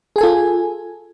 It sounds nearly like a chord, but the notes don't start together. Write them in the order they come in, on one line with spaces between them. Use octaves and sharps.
G#4 G#5 A4 F4